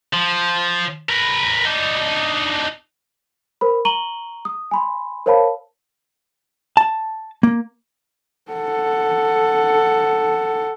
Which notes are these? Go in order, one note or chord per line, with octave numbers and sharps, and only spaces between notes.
F3
A#4 B4
D4 D#4
A#4 C5 B5
A#5 C#6 D#7 F#7 G7
D#6
G#5 B5 C6
A#4 C5 C#5 F5 A5 B5
A5
A#3
A4 F#5